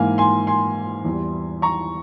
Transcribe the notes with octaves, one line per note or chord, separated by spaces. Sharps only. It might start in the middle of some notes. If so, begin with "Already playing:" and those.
Already playing: G#2 E3 A#3 F5 G#5
G#5 C6
G#5 C6
E2 E3 G3
A#5 C#6